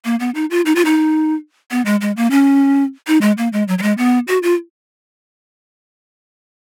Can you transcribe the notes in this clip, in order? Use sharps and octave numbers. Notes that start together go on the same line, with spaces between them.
A#3
B3
D#4
F4
D#4
F4
D#4
B3
G#3
G#3
A#3
C#4
D#4
G#3
A#3
G#3
F#3
F#3
G#3
B3
F#4
F4